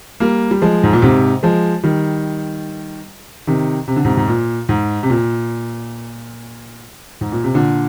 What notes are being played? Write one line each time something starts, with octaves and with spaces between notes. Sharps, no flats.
G3 A#3
G3
F3 G#3
G#2
A#2
G#2 C3
F3 G#3
D#3 G3
C3 D#3
C3
D3
G#2 C3
G#2
A#2
G#2
C3
A#2
G#2
A#2
C3
A#2 D3